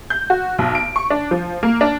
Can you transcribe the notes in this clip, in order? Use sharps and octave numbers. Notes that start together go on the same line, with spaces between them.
G6
F#4
B1
D7
C#6
D4
F3
A#3
D4